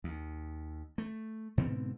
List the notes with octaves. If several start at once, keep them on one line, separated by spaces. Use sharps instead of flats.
D#2
A3
G#2 B2 D3 C4